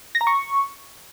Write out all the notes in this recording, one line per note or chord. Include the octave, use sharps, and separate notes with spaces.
A#6
A#5
C#6